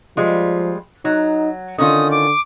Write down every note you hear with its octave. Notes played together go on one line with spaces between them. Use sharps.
F3 G3 G#3 F4
F#3 D#4
D3 D#3 C#4 F4 D#6
D6